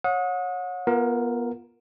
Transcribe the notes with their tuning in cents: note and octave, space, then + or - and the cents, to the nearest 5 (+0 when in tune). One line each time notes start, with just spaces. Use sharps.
C#5 -10 F#5 -35 D#6 +20
B3 -25 F4 -5 A#4 +0